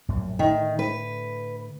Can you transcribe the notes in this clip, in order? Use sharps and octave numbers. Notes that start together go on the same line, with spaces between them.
A#1 F#2 A2
A2 D3 D#3
B4